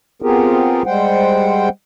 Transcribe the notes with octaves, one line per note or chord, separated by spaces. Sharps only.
B3 C4 F4 G4 G#4 A#4
G3 G#3 C5 F#5 G5